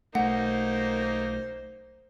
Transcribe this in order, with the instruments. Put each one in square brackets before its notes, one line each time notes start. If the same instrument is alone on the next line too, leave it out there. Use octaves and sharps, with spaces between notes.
[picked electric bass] B1 A3 [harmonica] A#3 D#4 [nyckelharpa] C5 [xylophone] F#5